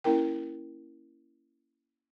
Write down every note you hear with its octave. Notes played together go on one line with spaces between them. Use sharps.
A#3 C#4 E4 A#4 G5